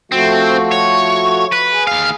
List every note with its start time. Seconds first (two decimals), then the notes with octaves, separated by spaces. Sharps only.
0.12 F3 A3 C4 F#4
0.71 C#5
1.52 B4
1.71 G#4
1.87 D#2 F5